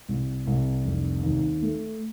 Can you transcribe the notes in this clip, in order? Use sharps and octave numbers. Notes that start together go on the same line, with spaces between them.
C2
C2
F1
D#2
A3